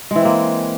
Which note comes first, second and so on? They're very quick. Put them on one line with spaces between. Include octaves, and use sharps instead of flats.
G#3 E3 C4 A#3